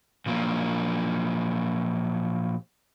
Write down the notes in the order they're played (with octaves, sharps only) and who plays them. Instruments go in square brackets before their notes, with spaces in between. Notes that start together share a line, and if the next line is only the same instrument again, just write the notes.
[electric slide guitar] A#2 F3 F#3 A#3